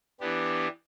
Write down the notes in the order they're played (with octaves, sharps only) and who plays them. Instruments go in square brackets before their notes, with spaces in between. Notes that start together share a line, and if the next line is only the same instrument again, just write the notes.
[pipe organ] E3 B3 D4 G4